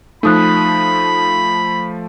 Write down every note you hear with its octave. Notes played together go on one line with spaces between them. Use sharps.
F3 A3 D#4 B5 D#6 F#6